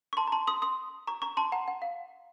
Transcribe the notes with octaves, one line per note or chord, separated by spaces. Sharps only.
C#6
A5 C6
A#5
A5 C6
C6 D#6
C6 D#6
A#5 C#6
A#5 C#6
A5 C6
F#5 A#5
F#5
F5